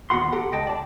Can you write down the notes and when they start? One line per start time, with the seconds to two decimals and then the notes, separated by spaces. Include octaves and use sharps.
0.10 D#2 B3 F#4 F#5 C6
0.32 G4 A4 F#5 A#5
0.52 C#2 D#5 G5 A5
0.67 D5 A5